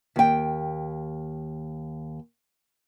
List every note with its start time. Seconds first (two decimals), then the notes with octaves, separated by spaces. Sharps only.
0.16 D#2 G5